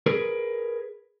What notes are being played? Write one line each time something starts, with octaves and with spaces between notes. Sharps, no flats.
G#4 A#4 B4